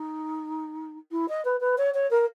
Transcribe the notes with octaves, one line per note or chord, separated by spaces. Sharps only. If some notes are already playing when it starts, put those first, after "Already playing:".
Already playing: D#4
E4
D#5
B4
B4
C#5
C#5
A#4